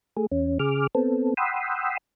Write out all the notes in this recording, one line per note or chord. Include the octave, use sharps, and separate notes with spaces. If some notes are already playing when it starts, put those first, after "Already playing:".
A3 G#4
E2 C#4
C#3 G#4 D6 F6
B3 C4 A4
F#5 G5 B5 C6 D#6 E6